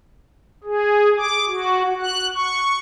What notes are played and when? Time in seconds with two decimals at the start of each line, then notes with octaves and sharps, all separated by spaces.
0.64 G#4
1.17 D6
1.47 F#4
2.00 F#6
2.35 C#6